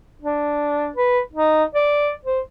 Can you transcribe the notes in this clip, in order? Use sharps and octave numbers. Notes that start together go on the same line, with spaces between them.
D4
B4
D#4
D5
C5